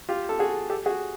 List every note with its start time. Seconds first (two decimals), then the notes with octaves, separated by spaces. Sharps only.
0.09 F4 G4
0.29 A4
0.39 F#4 G#4
0.70 G4 A4
0.86 F#4 G#4